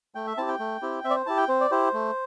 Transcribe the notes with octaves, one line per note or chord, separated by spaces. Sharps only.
A3 G5
E5
C4 E4 G4 A5
G5
A3
C4 E4 G4
C4 E5
D5
C5
E4 G4 A5
G5
C4 C5
D5
E4 G4 C5
A3